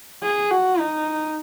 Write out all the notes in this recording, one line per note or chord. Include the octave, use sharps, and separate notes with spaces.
G#4
F#4
D#4